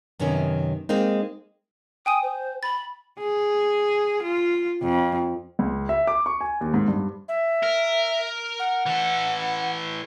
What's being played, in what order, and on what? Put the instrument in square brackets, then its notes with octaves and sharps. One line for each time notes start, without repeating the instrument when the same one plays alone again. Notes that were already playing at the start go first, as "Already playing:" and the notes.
[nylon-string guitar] F#2 C3 D#3 B3 C#4
G#3 A#3 C4 D#4
[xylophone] G5 G#5 D#7 [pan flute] D#6
[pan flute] C5
[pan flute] B5 [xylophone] A6
[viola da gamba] G#4
F4
F2
[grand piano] C#2
E5
D6
C#6
G#5
D#2
G#2
G2
[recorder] E5
[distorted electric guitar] A#4
[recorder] F#5
[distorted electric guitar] E3 A4